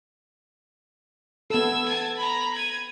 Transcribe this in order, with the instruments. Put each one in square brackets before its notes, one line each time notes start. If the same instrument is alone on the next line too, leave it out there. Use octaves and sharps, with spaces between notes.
[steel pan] B3 A4 [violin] E6 G#6
[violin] A5 G#6
A#5 B5
G#6 D#7